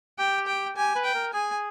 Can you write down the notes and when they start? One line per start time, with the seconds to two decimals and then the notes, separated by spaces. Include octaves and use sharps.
0.19 G4 G5
0.47 G5
0.76 G4 G#5
0.95 B4
1.05 G5
1.14 A#4
1.33 G#4 G#5